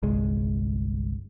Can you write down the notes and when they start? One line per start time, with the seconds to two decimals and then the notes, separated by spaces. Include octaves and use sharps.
0.03 G1 C2 G#3